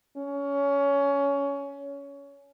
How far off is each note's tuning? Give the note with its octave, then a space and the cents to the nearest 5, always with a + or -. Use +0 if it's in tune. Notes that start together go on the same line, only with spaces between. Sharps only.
C#4 +20